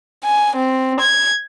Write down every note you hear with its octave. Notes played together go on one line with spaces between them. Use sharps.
G#5
C4
G#6